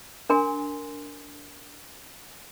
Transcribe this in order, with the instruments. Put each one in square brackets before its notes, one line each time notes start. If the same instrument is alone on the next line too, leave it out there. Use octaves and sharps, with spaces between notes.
[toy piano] D4 A#4 G#5 C6